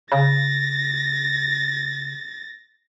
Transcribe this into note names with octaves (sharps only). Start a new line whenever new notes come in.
C#3 A6 A#6